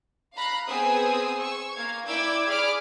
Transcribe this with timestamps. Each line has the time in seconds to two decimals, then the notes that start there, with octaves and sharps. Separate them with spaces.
0.33 F5 A#5 B5 F#6
0.67 B3 C4 G#4 G#5 D#6 E6
1.38 C#6 E6
1.73 A#3 F5 G#6
2.07 E4 D5 G5 D6 E6 G#6
2.48 G#4 D5 B5 D6 F6